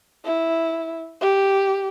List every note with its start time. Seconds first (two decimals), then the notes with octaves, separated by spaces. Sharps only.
0.25 E4
1.21 G4